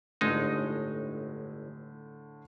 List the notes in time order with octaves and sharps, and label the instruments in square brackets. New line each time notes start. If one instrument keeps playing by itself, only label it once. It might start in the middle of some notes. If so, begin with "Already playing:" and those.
[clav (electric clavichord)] G1 G#3 D#4 [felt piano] A2 D3